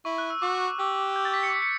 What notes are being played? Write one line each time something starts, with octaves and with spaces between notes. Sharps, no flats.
E4 C#6
F#6
E6
F#4 D6
G4 E6
G6
A6
B6
C#7
B6
C#7